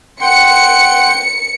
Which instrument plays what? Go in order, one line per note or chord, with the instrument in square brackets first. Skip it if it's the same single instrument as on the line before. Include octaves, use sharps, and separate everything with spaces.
[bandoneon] F#5 G5 C6 [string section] C#7